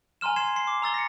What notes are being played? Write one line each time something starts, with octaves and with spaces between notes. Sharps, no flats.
G#5 A#5 C6 F6 E7
C6 G#6 C7 E7
C6 C7
D6
A#5 E6 A6 G7
A#6 C#7